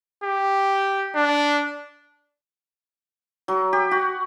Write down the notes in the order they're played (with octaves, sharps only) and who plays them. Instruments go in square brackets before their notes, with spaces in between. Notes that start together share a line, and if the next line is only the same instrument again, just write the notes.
[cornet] G4
D4
[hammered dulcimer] F#3
G4
F#4